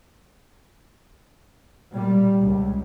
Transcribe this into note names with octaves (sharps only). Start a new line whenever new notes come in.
A#2 G3
C#2